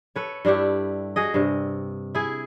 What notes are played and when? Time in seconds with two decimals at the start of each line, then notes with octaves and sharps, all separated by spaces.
0.16 A4 B4 C#5
0.45 G2 D4 E4 G4
1.16 F#4 G#4 D#5
1.34 G2 C3
2.15 E4 G#4